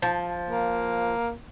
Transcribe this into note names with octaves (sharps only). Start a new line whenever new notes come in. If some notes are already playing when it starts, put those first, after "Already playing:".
F3
A#3